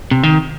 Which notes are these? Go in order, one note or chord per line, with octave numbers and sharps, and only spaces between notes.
C3
D#3